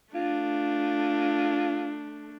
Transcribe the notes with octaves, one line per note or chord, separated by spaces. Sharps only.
A3 D4 F4